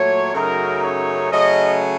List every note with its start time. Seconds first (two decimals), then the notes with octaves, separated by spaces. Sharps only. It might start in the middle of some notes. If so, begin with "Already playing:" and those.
Already playing: A#2 F#3 A3 C#5
0.34 F#2 C#3 F#3 A3 D#4 A#4
0.83 C#5
1.31 C#3 F#3 A3 C#4 D#5